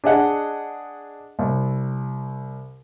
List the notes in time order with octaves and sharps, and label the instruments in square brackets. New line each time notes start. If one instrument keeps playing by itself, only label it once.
[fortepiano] D4 G#4 D#5 F#5
C2